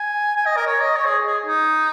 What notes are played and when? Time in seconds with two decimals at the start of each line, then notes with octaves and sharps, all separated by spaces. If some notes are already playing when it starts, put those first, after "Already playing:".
Already playing: G#5
0.36 G#5
0.46 D#5
0.57 A#4
0.67 C#5
0.81 D#5
0.96 C#5
1.06 G#4
1.27 G#4
1.46 D#4